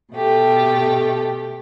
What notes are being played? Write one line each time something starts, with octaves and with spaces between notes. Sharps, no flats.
B2 A3 G4